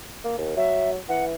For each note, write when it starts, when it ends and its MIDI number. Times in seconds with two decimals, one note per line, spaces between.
0.24 0.37 58
0.38 0.54 39
0.57 0.97 54
0.57 0.90 76
1.09 1.35 52
1.09 1.25 78